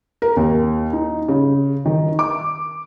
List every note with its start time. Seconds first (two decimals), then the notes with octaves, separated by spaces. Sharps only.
0.22 A#4
0.37 D#2
0.93 D#4
1.28 C#3
1.86 D#3
2.19 D6